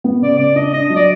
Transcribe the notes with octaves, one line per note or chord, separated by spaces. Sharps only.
B3
C#3 D5
C#3 D5
D4 D#5
D4 D#5
F#3
D5